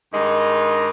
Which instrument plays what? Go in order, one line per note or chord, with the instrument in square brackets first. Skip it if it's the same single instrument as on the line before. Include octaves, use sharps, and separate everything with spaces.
[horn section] G2 D#3 G#3 D#4